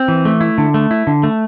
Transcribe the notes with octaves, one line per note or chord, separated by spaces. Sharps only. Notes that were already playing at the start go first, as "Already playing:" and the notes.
Already playing: C4
E3
A3
E4
D3
A3
E4
D3
A3